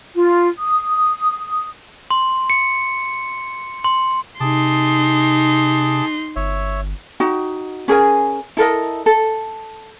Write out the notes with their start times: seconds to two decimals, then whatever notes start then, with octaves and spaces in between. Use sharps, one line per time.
0.15 F4
0.58 D#6
2.11 C6
2.50 C#7
3.84 C6
4.40 C3 D#4 G#4 A5 C6 D6
6.36 G1 C#5 E5
7.20 D#4 F#4 G5
7.88 C#4 G#4 A#4 G#5
8.57 E4 A4 A#4 D#5
9.06 A4